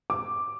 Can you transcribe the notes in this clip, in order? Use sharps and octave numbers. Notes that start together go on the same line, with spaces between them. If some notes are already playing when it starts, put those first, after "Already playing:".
D6